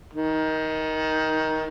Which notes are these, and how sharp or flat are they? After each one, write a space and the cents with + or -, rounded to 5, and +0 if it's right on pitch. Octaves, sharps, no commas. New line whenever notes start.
D#3 +15